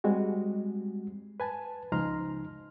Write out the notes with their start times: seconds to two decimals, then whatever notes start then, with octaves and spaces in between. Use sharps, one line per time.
0.04 G3 G#3 C4 F#4
1.40 B4 G#5 A5
1.92 C#2 F3 D#4 A#5 C6 F6